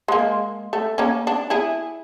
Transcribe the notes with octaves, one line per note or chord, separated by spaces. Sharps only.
G#3 A#3
A3
A#3 C#4
D4
E4 G#4